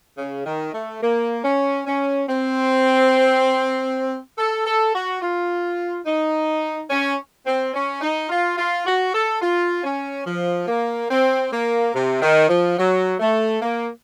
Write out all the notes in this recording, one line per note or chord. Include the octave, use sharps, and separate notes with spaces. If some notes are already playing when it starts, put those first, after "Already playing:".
C#3
D#3
A3
A#3
C#4
C#4
C4
A4
A4
F#4
F4
D#4
C#4
C4
C#4
D#4
F4
F4
F#4
A4
F4
C#4
F3
A#3
C4
A#3
C3
D#3
F3
F#3
A3
A#3